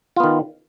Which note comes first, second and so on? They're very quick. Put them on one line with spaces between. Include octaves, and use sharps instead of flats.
F4 B3 D#3